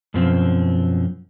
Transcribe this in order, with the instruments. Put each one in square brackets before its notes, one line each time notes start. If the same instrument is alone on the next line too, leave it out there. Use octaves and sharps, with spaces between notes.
[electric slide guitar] F#2 B2 F3 C4